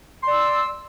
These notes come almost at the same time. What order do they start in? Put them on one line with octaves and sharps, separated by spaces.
C6 D5 E6